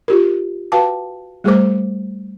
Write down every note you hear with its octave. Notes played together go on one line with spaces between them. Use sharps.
F4 G4 A#4
F#4 B4 F5 G5 A5 D6
G3 A3 G#4 A#4 C5 D6